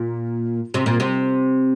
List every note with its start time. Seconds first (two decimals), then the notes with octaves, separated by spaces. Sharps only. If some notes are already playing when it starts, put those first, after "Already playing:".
Already playing: A#2
0.74 C3
0.86 A#2
1.00 C3